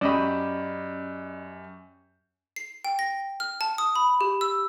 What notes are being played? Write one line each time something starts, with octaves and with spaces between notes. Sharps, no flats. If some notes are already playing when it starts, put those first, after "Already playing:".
F#2 C#4 G4 D5 D#5 B5 E7
C7
G5
A#6
F6
A5
D#6
B5
G4
E6